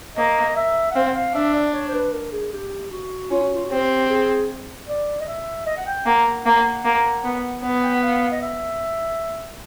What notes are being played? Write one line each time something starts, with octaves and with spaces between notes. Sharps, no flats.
A#3 D#5
E5
F#5
C4 F5
F#5
F5
D4 E5
D5
C#5
C5
B4
A#4
G#4
G4
F#4
C#4 F4
F#4
F4
F#4
C4 G4
G#4
D5
D#5
E5
D#5
F#5
G5
A#3 F#5
F#5
A#3
A#3
B3
B3
G5
F#5
F5
D#5
E5